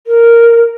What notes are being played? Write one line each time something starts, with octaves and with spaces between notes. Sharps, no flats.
A#4